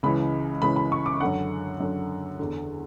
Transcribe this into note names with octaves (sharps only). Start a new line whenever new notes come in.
C#2 C#3 E3 B5
C#2 C#3 E3 B5
B5
C#6
D6
F#2 D3 F#5
F#2 D3
E2 D3